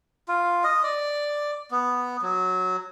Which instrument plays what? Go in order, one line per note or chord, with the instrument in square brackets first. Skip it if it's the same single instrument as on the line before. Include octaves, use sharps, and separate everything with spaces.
[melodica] F4
D#5
D5
B3
F#3